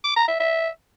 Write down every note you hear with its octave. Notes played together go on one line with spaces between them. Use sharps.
D6
A#5
E5
E5